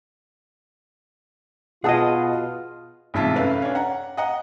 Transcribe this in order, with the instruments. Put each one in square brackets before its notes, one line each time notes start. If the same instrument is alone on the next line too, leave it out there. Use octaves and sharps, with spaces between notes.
[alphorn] B2 [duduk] F4 [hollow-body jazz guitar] G#4 D#5 [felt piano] F#5 A5 D#6
[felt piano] A1 G#2 C3 F4 E5 A5
F#2 A3 B4 F5
C#4 D4
F#5 A#5
D#5 F#5 A#5